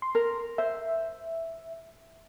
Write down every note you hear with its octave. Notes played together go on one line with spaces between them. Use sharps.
C6
A#4
C5 E5